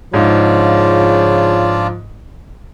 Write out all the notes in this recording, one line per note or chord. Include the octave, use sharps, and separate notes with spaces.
G#2 C#3 F3 D4 F4 D5